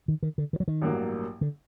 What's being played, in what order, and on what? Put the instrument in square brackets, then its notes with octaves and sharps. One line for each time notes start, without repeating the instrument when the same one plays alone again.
[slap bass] D#3
D#3
D3
D#3
F#3
D#3
[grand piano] A1 G2 F#3 A#3
[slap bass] D3